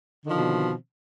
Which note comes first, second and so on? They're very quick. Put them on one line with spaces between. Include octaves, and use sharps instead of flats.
D3 D#3 F3 C4 B2